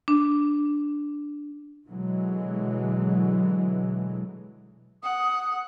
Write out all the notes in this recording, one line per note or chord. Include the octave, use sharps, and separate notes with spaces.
D4
B2 D3 E3 F#3 G#3
F#5 D#6